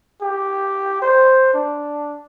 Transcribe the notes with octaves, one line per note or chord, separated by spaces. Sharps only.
G4
C5
D4